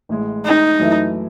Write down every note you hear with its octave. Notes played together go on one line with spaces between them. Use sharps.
A1 A2 G#3
D#4
F#2 E3 A3 E4